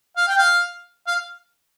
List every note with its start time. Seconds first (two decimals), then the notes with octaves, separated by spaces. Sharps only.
0.17 F5
0.28 G5
0.38 F5
1.07 F5